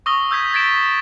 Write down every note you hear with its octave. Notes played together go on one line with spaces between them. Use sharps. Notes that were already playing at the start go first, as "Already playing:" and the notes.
C#6 D#6 E6 A#6 G7
E6 G6 G#6 B6
G#6 A6 B6 D7 E7